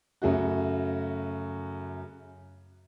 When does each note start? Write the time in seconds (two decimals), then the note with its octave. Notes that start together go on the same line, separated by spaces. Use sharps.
0.22 F#2 C#3 A3 F#4